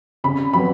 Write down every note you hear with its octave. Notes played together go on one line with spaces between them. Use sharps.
C#3 B5
F#3 B3 B5